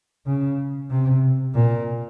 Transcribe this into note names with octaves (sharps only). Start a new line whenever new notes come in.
C#3
C3
A#2